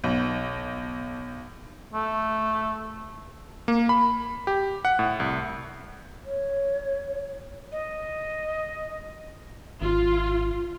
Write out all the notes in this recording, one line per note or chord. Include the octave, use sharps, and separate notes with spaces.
B1
A3
A#3
B5
G4
F#5
A2
C2
C#5
D#5
G#1 F4